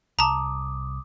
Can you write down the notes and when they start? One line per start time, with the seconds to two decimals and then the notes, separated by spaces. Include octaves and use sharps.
0.19 C2 A5 A#5 D6 D#6